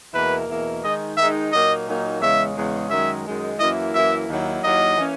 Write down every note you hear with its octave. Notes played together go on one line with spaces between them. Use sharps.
E2 B2 A#3 E4 A#4 B4
E2 B2 A#3 E4 A#4
D#3 G#3 D#4 D#5
D#3 G#3 D#4 E5
A#2 F#3 A#3 D#4 D#5
A#2 F#3 A#3 D#4
E2 C#3 G#3 E5
E2 C#3 G#3
F#2 D#3 G#3 E5
F#2 D#3 G#3
F#2 E3 A#3 E4 D#5
F#2 E3 A#3 E4 E5
D#2 D#3 F#3 A#3 E4
D#2 D#3 F#3 A#3 E4 D#5
E3 A#3 C#4